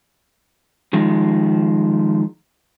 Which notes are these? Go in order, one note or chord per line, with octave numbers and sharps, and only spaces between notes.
D#3 F3 G#3